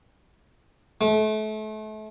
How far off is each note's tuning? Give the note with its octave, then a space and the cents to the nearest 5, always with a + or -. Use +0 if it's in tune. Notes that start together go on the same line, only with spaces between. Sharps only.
A3 -35